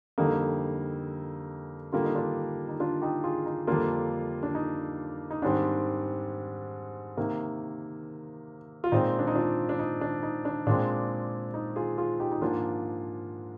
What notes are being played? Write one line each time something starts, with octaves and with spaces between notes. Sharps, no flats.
F2 D3 G3 A#3 D#4
D3 G3 A#3 F4
D#4
D4 F4
D#4
D4 F4
D#4 G4
F4 G#4
D#4
F2 D3 G3 A#3 D4 F4
D4
D#4
D#4
G#2 D#3 G3 C4 D4
C3 D#3 A#3
F4
A#2 G#3 C4 D#4
D4
D#4
D4 F4
D4
D#4
D4
D#4
D4
A#2 G#3 C4 D4
D#4
F4 G#4
F4 G#4
D#4 G4
D#4
G#2 F3 A#3 D4 F4